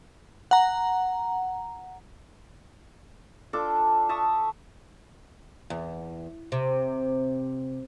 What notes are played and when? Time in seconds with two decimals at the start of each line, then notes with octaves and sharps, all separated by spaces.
0.51 F#5 A#5
3.53 D4 F4 A4 D6
4.09 E5 A5 C#6 D#6
5.70 E2
6.52 C3